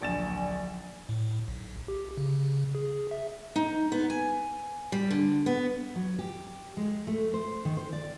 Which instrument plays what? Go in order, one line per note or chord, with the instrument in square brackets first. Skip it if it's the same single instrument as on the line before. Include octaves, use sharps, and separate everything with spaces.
[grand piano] D1 A#1 A6 E7
[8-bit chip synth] A2
B1
G4
C#3
G#4
E5
[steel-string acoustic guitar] D#4
B3
G#5
G3
D3
B3
F#3
G4
G#3
A3
C5
D#3
C5
D5